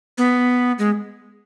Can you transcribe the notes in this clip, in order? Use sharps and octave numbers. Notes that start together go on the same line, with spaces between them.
B3
G#3